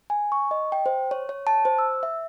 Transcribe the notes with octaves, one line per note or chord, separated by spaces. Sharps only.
G#5
C#6
D#5
G5
C5
C#5
C#5
A5
C5
E6
E5